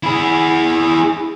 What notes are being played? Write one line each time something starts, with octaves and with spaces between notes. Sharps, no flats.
E4 G#4